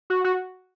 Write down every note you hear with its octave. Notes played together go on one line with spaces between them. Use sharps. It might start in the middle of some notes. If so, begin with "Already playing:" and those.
F#4
F#4